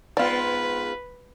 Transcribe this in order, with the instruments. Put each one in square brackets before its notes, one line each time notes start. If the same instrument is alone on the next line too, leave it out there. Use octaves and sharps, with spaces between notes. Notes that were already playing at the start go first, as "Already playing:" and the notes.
[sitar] G#2 B3 F4 [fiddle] B4 [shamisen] D5 F5